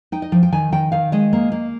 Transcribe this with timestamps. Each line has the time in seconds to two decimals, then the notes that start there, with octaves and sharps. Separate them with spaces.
0.12 D#4 G5
0.22 D#5
0.32 F3 G5
0.43 G5
0.52 D#3 G#5
0.72 D#3 G5
0.92 D#3 F5
1.12 G#3 D#5
1.33 A#3
1.52 A#3